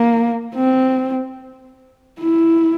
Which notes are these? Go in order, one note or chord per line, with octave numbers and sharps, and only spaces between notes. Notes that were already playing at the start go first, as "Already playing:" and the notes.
Already playing: A#3
C4
E4